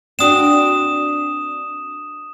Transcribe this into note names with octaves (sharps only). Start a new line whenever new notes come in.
C4 D4 F#4 D#6 E7